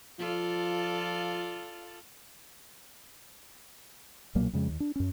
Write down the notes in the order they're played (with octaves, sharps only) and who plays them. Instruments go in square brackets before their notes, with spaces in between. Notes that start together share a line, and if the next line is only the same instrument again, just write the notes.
[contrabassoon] F3 [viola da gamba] F4 A4 D5
[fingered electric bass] B1 A#2 F#3 A#3
F2 C#3 G#3
D#2
D4
F#2 C#4